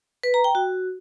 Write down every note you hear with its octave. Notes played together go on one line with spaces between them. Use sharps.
B4
A#5
G5
F#4